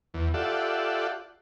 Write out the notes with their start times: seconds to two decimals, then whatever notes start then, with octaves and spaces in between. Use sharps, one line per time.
0.14 E2
0.34 F4 G4 A4 D5 E5 F#5